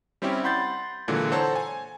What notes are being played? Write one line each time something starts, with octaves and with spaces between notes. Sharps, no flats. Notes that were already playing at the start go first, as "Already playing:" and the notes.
G3 C4 C#4 E4 G4
F#5 B5 C6 G6 A6
A#2 D3 E3 F#3 G#3
A4 C5 C#5 F#5 A5 A#5
G#5